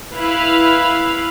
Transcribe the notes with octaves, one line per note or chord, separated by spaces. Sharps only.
E4 B4 F5